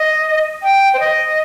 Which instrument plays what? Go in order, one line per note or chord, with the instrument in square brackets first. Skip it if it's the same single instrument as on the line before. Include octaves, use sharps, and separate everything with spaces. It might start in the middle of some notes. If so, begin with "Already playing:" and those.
Already playing: [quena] D#5
G5
C5
D#5